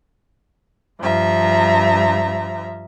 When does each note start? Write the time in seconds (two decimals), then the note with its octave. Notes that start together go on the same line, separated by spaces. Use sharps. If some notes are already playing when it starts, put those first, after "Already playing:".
0.99 G2 F3 E5 A#5